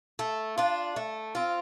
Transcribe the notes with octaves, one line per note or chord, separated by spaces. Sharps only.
A3
D4 F4
A3
C4 F4